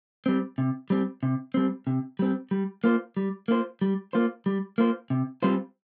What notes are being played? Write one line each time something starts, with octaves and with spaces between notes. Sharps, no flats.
G3 C4
C3
G3 C4
C3
G3 C4
C3
G3 C4
G3
A#3 F4 C5
G3
A#3 F4 C5
G3
A#3 F4 C5
G3
A#3 F4 C5
C3
G3 C4 F4 C5